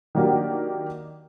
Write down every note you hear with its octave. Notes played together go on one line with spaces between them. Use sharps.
D#3 F#3 A#3 D4 F#4 G4